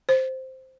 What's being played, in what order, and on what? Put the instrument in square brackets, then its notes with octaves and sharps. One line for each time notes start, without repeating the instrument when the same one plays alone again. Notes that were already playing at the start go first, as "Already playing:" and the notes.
[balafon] C5